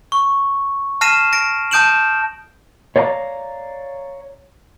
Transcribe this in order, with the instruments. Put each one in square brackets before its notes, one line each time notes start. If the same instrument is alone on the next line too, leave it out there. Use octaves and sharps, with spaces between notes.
[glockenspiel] C#6
A5 F6 A#6 C7 D#7 E7
A#6 D7
A5 D#6 G6 D7 E7 F#7
[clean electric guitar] C#5 D5 F5 G5 A#5